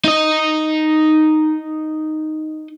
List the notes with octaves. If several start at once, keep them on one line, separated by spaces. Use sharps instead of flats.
D#4 D#5